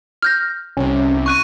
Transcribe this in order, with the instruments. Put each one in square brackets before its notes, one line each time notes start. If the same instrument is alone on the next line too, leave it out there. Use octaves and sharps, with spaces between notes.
[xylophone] F6 G6 A#6
[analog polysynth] C2 C3 [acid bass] C#4
[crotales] C#6 F#6 D#7